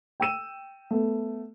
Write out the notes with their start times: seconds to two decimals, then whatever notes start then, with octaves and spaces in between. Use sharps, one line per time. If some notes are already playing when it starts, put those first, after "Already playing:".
0.20 G5 E6 D#7 E7
0.91 A3 B3